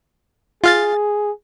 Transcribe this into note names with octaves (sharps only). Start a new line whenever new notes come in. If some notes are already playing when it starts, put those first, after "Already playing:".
F4 G#4 F5 A6